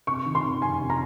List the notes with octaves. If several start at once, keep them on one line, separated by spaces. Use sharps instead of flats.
C3 C#6
D#3
C6
C3
F2 G#5
C3
A#5